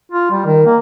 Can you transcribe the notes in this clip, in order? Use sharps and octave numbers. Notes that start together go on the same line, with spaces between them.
F4
G3
D#3
A#3